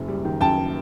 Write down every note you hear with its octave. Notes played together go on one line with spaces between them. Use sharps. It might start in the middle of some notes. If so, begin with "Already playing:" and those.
Already playing: F#1 F#2
G3
D#3
F#2 G5 A5